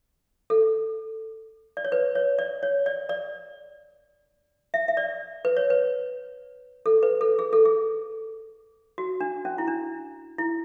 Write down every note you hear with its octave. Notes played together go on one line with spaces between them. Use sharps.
A4
D5
C#5
B4
C#5
D5
C#5
D5
D5
E5
E5
D5
B4
C#5
B4
A4
B4
A4
G#4
A4
G#4
F#4
D4
C#4
E4
D4
E4